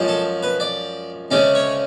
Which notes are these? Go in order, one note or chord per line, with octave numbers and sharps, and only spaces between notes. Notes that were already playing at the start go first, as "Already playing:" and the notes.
Already playing: F#2 F3 G#3
A4
B4
D5
D2 C#3 G#3 C#4 D5
C#5